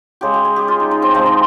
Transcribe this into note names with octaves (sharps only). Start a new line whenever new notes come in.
C#3 G#3 G4
G4
G#4
G4
F4
D#4
D#4
C4
C3 F3 G#3 C4
D#4